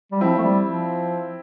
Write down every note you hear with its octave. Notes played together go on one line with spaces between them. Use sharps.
G3
F3 C4 E4
A3
G3
F3